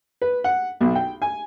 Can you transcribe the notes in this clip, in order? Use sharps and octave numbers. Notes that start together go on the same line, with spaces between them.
B4
F#5
B1
G5
G#5